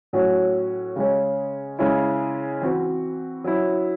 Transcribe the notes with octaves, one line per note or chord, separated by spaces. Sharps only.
A2 F#3 C#4 F#4
C#3 G#3 C#4
C#3 G#3 C#4 E4
E3 C4 F#4
F#3 C#4 E4